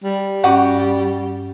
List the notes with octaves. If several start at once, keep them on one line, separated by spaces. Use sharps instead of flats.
G3
G2 C#4 F#4 G4 F#5